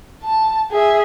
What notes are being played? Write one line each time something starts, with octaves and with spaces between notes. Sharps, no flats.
A5
G#4 E5